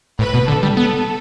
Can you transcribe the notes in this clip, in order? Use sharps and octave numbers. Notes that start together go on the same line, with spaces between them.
A2 B4
B2
D3 A4
G3
B3 A4